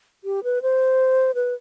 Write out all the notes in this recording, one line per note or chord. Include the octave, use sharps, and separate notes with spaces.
G4
B4
C5
B4